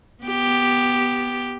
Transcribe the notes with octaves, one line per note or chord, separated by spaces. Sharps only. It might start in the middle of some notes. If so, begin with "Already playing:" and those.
B3 G4